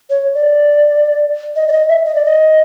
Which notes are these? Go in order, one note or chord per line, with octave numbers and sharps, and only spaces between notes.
C#5
D5
D#5
D5
D#5
E5
D#5
D5
D#5